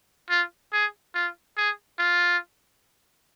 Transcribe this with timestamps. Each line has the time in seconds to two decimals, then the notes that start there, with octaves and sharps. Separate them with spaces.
0.29 F4
0.73 G#4
1.15 F4
1.57 G#4
1.99 F4